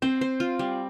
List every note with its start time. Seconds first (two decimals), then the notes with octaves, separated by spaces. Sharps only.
0.02 C4 C5
0.21 C5
0.40 F4
0.59 G3